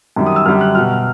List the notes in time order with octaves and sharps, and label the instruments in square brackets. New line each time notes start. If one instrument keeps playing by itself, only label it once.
[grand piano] F#2 D#3 G3
D#6
E6
F#2 D3 G3 F6
F#6
B2 F#3 F6